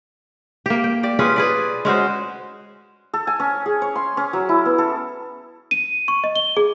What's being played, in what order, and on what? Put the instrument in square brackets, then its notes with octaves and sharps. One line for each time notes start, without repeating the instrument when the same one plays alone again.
[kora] A#3 G4
G5
G4 D5
C#4 F4 G#4 B4
G#4 B4 D5
G#3 C#4 F#4 C5
[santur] A4
G#5
C#4
G#4
C#5
C6
C#4
F#3
E4
B3
A4
[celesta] D#7
C#6
D#5
G7
G#4